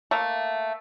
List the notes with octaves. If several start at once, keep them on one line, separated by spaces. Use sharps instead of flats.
A3 A#3